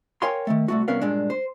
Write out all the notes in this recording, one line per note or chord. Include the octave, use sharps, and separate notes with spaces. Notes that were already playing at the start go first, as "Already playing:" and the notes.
A#4 C#5 F5 G5 G#5 C6
D#3 E3 A3
C2 A3 F#4
C2 B3 C#4 A#4 B4 F5
G2 A#2 G#3 D4
C5